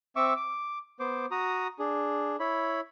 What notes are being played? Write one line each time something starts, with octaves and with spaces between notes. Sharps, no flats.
C4 E5 C#6 D6 E6
D6
B3 C5 D6
F#4 A#5 D#6
D4 G#4
E4 C#5 B5